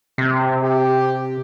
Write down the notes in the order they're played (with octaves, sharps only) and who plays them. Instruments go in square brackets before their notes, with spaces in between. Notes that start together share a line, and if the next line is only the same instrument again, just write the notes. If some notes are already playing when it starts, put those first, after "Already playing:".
[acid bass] C3
[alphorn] G4